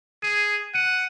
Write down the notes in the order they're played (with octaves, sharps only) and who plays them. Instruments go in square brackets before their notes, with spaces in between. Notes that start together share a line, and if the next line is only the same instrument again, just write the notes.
[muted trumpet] G#4 [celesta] D#7
[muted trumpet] F#5 [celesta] D#7